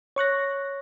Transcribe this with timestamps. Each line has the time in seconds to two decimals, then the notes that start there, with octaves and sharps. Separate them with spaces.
0.16 C#5 C#6 F#6 A#6